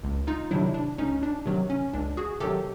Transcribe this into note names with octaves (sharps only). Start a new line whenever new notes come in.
C#2
D#4 F4
C3 D#3 F#3 D4 E4
D4
C#2 C#4 D#4
D4
C3 D#3 F#3
C#4
C#2 D4
F#4 G#4
C3 D#3 F#3 G4 A4